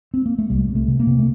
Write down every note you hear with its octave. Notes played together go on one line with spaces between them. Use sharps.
C4
A#3
A3
C2 G3
C3
A3
C3
A#3
C3
A3